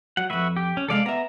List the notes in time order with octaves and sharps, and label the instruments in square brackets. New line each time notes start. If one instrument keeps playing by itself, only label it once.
[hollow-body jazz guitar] F#3 [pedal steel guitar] F#5
[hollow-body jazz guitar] C2 F2 [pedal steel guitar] F#4 B4 E5
[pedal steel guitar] G4
C#4
[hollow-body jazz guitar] C3 F#3 G#3 [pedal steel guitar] A4 D5 F5
[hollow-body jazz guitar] B3 E5 [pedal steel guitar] A#5